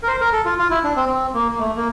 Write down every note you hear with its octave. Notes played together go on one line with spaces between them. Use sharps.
A#4
C5
A#4
A4
F4
F4
E4
D4
C4
C4
A#3
A#3
A3
A#3